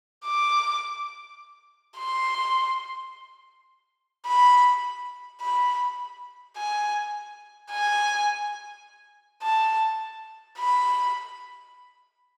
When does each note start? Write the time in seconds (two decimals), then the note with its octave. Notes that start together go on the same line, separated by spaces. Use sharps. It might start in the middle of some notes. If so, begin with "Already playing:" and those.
0.25 D6
1.98 C6
4.27 B5
5.41 B5
6.57 G#5
7.71 G#5
9.43 A5
10.58 B5